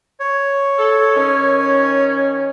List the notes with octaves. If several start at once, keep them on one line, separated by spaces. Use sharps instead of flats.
C#5
A4
D#3 C#4